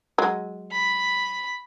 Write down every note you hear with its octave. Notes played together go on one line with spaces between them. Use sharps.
F#3 G#3
B5